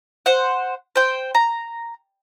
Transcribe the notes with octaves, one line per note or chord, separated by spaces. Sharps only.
C5 F#5
C5 G5
A#5